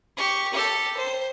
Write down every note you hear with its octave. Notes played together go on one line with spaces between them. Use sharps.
G4 C#6
G4 A4
C5